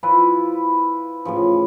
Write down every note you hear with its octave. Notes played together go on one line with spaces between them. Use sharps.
F3 E4 B4 A5
A2 C#3 E3 F3